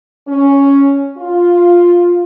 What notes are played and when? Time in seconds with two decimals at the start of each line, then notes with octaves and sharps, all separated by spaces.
0.28 C#4
1.18 F4